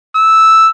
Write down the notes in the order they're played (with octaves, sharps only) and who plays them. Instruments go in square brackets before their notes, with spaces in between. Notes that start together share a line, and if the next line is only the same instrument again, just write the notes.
[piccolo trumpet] E6